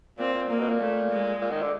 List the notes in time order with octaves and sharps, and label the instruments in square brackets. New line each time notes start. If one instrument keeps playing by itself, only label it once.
[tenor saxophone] A#2 [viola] C4
[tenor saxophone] A#2
[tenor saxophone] A#2 [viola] A#3
[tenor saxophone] B2
A#2
[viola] A3
G#3
[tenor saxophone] A#2
D#3
D3